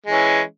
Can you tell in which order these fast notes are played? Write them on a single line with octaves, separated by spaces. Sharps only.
G#3 E3 C#4